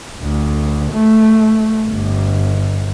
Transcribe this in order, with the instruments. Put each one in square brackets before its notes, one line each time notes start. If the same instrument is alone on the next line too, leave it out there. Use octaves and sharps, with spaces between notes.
[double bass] D2
A3
G1